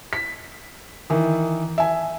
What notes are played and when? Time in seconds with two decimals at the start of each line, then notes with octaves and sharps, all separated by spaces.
0.13 B6
1.10 D#3 E3
1.78 E5 G#5